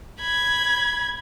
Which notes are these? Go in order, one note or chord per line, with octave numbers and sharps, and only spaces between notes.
B5 G#6